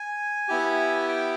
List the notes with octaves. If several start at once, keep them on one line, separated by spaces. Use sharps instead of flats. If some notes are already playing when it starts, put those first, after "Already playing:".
Already playing: G#5
B3 E4 G4
G5